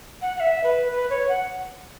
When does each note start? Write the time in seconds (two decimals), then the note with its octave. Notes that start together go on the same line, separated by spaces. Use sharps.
0.22 F#5
0.36 F#5
0.40 E5
0.64 B4
0.92 B4
1.10 C#5
1.29 F#5